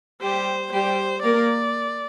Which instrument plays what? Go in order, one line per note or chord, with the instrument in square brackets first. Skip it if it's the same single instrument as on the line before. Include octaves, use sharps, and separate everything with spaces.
[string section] G3 G4 [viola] C5
[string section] G3 G4 [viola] C5
[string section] A#3 A#4 [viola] D5